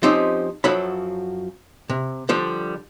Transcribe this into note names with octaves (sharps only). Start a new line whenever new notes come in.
F3 C4 C#4 D#4 G4
F#2 F3 F#3 A4 B5
C3
D3 F3 G3